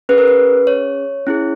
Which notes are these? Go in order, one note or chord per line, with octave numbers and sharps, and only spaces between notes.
C#4 G#4 B4
A#4
B4
C#5
C#4 E4 G#4